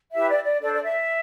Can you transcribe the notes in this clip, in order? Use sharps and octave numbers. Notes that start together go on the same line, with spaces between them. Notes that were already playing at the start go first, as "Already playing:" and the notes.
E4 G4 B4 E5
D5
D5
D4 A4 C5 D5
D5
E5